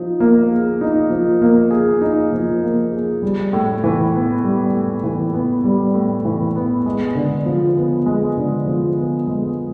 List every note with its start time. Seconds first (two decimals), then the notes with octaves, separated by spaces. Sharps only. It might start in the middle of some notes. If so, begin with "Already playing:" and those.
Already playing: F3 D#4
0.20 A#3
0.50 G#4
0.81 D#4
1.10 F3
1.42 A#3
1.71 G#4
2.01 D#4
2.32 F3
2.63 A#3
2.92 G#4
3.22 G3
3.53 A2
3.84 E3
4.14 B3
4.44 G3
4.73 A2
5.03 E3
5.34 B3
5.64 G3
5.94 A2
6.25 E3
6.55 B3
6.86 G#3
7.15 D3
7.46 F3
7.77 B3
8.06 G#3
8.37 D3
8.66 F3
8.98 B3
9.27 G#3